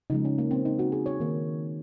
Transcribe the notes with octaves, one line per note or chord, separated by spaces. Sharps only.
C#3 F3 G#3 D#4
C#4
A#3
C4
D#4
F#4
G#4
C#5
D#3 A#3